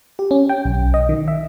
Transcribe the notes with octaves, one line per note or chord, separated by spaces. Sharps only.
G4
C#4
G5
B1
D#5
D#3
E5